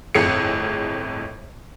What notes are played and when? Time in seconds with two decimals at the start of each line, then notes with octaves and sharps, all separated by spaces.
0.15 G1 F2 A2 G#4 C#7